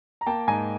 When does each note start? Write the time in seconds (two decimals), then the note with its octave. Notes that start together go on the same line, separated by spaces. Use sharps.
0.21 A#5
0.26 A#3 G5 A5
0.47 G#2 G#5 A#5